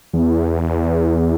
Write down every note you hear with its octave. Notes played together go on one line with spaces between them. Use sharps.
E2